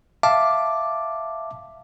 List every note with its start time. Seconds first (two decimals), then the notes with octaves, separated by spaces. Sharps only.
0.23 E5 F5 A5 D6